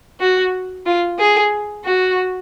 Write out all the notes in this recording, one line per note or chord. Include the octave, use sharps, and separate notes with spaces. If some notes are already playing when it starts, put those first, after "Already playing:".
F#4
F4
G#4
F#4